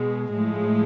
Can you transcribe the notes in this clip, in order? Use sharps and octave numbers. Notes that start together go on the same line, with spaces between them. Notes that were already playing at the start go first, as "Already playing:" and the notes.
Already playing: B2 G#3
A2 F3 G#3